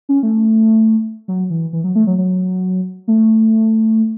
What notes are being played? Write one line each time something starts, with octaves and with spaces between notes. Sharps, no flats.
C#4
A3
F#3
E3
E3
F#3
A3
F#3
F#3
A3